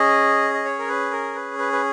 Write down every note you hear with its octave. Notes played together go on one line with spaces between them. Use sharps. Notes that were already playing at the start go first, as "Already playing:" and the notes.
Already playing: C#4 G#4 D#5
D#5
C#5
A#4
B4
A#4
B4
B4
B4